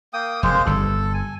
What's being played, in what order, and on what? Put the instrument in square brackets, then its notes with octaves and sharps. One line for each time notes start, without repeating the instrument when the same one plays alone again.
[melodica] A#3 G5 D#6
[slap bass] F1 [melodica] G#3 A#3 C5
[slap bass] G1 G2 [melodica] A4
[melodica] G#5